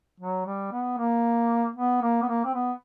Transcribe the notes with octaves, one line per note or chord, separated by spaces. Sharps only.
F#3
G3
B3
A#3
B3
A#3
B3
A#3
C4
B3